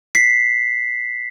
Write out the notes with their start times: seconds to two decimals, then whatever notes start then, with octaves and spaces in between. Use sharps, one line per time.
0.15 B6 C7